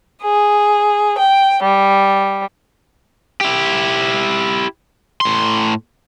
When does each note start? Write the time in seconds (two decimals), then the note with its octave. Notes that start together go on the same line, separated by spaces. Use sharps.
0.21 G#4
1.17 G5
1.63 G3
3.41 E4 G4
5.21 A2 C6